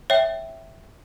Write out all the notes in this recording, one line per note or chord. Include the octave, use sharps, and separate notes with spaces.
C#5 E5 G5